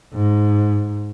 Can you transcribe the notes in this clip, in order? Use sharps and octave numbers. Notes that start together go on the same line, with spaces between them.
G#2